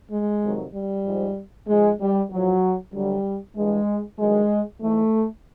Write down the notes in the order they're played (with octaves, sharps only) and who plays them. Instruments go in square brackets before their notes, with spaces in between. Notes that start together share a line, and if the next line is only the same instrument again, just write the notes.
[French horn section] G#3
F2 C3 D#3 F#3
G3
G#2 F3
G#2 F3 G#3
G3
A2 F3 F#3
D2 D3 F#3 G3
G2 E3 G#3
G2 D#3 F#3 G#3
G#2 E3 A3